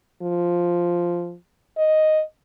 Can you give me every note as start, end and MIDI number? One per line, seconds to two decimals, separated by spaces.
0.22 1.35 53
1.77 2.22 75